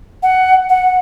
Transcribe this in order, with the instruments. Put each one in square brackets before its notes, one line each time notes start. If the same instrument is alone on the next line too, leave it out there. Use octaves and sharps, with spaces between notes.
[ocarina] F#5
F#5